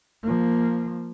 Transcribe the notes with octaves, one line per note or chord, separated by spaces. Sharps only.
F3 A#3